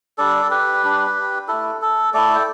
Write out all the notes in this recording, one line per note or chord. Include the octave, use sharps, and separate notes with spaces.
G3 D4 A4 D5
G4 B4
G3 D4
A3 E4 A4
A4
A3 E4 A4 D5
G5